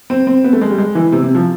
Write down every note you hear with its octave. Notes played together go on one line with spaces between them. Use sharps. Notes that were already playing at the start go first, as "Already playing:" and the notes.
C4
C4
B3
A3
G#3
G3
G#3
E3
C3
C3
F3